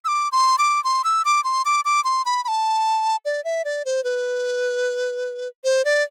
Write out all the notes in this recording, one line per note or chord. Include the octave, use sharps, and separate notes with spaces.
E6
D6
C6
D6
C6
E6
D6
C6
D6
D6
C6
B5
B5
A5
D5
E5
D5
C5
B4
C5
D5